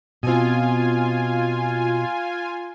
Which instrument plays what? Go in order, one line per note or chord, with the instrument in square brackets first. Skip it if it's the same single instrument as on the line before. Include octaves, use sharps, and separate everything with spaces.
[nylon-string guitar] B2 C4 [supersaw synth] F4 G#5